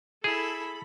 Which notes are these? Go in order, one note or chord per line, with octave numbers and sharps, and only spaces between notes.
E4 G#4 A4 B5